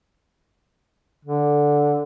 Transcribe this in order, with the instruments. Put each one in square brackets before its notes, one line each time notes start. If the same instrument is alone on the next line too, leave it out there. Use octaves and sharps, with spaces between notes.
[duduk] D3